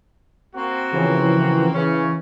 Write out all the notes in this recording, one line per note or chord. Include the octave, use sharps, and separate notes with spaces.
A#3 C4 F#4
C#3 E3 F3
C#3 E3 C#4